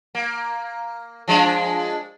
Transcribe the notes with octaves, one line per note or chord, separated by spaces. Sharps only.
A#3
F3 G#3 D4